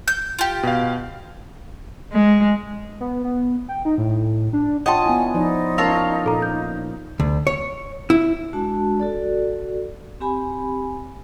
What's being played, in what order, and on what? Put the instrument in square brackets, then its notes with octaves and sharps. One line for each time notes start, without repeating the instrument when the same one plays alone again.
[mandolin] G6
F4 G4
[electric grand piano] B2 F5
[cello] G#3
[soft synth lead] B3
B3
G5
D#4
A2
D4
[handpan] F4 C#5 [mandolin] D#5 A5 [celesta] F#5 G5 C6
[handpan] B3 D4 E4 [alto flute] G#5
[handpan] F3 D5 [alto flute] D#4
[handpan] C#4 A#4 F5 [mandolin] F4 C#5 A5 [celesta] E6 A#6
[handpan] A#2 [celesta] A4 A#5
[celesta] G6
[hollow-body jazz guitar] D2
C#5
E4
[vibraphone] G#3 D4 F#4 A5
F#4 A4 D5
C4 G4 G#5 B5